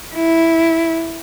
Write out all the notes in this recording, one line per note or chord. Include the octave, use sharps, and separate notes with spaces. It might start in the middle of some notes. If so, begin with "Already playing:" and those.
E4